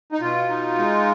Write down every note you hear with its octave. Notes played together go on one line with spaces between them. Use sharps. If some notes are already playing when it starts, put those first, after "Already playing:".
D#4
B2 F4
D#4
G#3